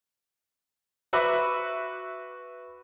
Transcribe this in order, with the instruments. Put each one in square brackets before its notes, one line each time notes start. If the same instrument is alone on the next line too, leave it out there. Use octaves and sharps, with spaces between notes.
[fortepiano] F#4 B4 E5 B5 D6